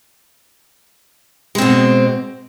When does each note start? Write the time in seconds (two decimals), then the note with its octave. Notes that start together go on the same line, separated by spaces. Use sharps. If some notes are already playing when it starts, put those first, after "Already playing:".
1.55 G#3
1.58 C4
1.62 B2